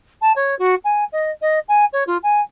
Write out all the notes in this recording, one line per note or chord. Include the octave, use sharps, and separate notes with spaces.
A5
C#5
F#4
G#5
D#5
D#5
G#5
C#5
F4
G#5